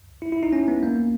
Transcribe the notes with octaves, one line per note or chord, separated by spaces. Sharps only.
E4
E4
D#4
C#4
B3
A#3